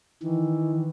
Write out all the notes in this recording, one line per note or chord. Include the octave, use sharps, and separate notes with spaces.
D#3 E3